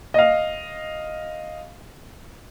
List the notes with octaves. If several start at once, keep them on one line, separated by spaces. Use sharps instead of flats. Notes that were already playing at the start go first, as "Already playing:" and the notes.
D#5 F5